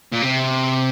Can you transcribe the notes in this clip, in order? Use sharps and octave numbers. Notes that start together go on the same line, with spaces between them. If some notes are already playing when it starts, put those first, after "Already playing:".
A#2
C3